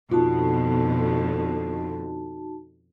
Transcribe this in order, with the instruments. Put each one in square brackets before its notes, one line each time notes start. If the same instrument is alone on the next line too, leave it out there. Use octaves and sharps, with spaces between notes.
[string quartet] F2 D3 [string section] B2 [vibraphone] D#4 F#4 A5 [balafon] F4